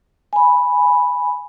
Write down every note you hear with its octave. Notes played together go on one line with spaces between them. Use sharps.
G#5 B5